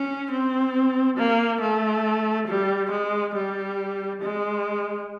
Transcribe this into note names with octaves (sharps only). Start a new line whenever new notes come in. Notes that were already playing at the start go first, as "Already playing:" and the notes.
Already playing: C#4
C4
A#3
A3
G3
G#3
G3
G#3